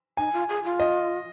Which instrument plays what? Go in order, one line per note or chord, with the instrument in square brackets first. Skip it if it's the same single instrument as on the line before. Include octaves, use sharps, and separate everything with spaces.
[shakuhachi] D#4 [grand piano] G#5
[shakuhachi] F4
G#4
F4
[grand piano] D#5